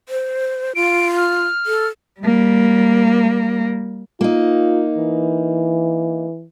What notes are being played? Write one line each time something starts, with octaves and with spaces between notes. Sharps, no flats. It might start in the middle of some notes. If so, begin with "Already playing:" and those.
C5
F4 D7
F6
A4
G3 A#3
A#3 D#4 F4
E3